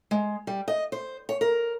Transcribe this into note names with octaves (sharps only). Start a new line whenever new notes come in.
G#3
G3
D#5
C5
C#5
A#4